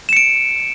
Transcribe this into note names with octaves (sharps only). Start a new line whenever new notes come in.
C#7 D7 E7